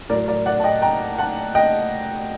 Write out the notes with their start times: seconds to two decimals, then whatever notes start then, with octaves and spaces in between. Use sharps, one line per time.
0.10 A2 A#4 D5
0.13 F#3
0.28 A#4 D5
0.46 D5 F#5
0.60 A5
0.64 D#5 G5
0.82 G5 A#5
1.19 F#5 A5
1.55 D#5 G5